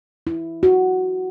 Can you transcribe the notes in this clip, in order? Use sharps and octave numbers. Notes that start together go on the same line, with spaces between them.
E4
F#4